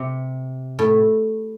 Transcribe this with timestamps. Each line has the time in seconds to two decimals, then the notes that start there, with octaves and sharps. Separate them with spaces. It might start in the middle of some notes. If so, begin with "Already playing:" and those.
Already playing: C3
0.79 A2